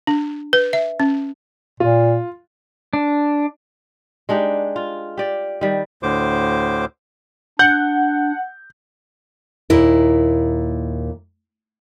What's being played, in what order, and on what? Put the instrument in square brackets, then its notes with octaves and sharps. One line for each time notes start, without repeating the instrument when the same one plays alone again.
[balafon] D4
B4
E5
C#4
[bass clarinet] A#2 [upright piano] F4
[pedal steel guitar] D4
[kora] G#3 D4 D#4 G4
F4
G4 D5
D#3 G3
[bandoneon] D2 A2 D3 C5 D6
[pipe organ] D4 [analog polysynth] F#5 [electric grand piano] G6
[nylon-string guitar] D#2 A#2 E4 A#4